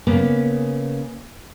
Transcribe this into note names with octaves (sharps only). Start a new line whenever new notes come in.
C#3 A#3 B3